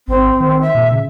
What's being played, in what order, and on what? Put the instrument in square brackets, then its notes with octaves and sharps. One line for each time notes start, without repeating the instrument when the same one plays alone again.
[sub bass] G#1 [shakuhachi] C4
[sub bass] D#3
[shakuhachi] E5
[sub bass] A#2
C#3